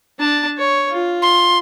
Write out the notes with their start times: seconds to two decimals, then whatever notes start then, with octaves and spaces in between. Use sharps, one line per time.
0.19 D4 A5
0.58 C#5
0.91 F4
1.22 C6